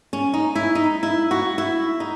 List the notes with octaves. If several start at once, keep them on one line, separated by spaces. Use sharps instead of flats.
C#4
D#4
E4
D#4
E4
F#4
E4
D#4